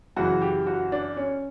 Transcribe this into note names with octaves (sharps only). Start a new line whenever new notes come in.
F#2 C#3 E3 F#4
G4
F#4
D4
C#4